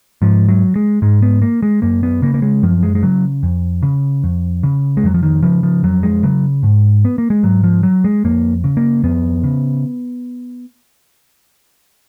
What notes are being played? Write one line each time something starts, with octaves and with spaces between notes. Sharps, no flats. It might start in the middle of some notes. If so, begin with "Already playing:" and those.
G#2 F3
F#3
G#3
G#2 G#3
B3
A#3
G#3
F#2 A#3
B3
C#3 A#3
A#3
G#3
F#2 F3
G#3
G#3
C#3 F#3
F2
C#3
F2
C#3
G#3
F2 F#3
F3
D#3
C#3 F3
F3
F2 F#3
G#3
C#3 F#3
G#2
B3
A#3
G#3
G#2 F#3
F3
F#3
G#3
F2 A#3
C#3
A#3
F2 B3
C#3